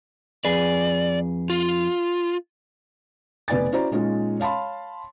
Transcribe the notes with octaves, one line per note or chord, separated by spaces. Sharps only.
F2 G#4 B4 D5
F4
F1 B3 B4 D5 G#5 A6
C#4 E4 F#4 C5 D5 A#5
A#2 G#3 C#4 D#4 F4
C#5 F5 A5 B5 C6